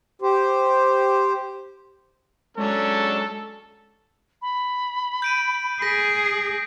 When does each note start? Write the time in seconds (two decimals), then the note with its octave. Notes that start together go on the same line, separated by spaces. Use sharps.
0.22 G4 C5
2.57 F#3 G#3 C#4 D4 A4
4.42 B5
5.22 G6 D7 D#7
5.82 G#4 A#6 B6 D7